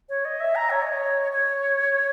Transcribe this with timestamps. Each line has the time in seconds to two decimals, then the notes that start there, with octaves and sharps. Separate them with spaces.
0.09 C#5
0.25 D#5
0.40 E5
0.55 A#5
0.70 C#5
0.82 D#5
0.93 C#5
1.32 C#5